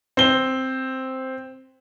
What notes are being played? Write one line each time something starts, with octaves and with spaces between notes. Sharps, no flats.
C4 G7